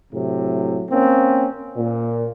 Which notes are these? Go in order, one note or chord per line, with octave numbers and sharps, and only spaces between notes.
A2 C3 F#3
A#3 C4 C#4
A#2